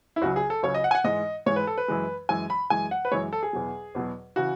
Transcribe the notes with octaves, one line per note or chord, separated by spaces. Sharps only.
E4
C#2 C#3 F#3 F#4
G#4
A4
C#2 C#3 F#3 C#5
D#5
F#5
G#5
F#5
G#2 E3 G#3 D#5
G#2 E3 G#3 C#5
B4
A4
B4
F#2 E3 G#3
F#2 E3 G#3 G#5
B5
F#2 E3 G#3 G#5
F#5
B4
F#2 E3 G#3 C#5
A4
G#4
E2 B2 F#3
E2 B2 F#3
C#3 E3 F#4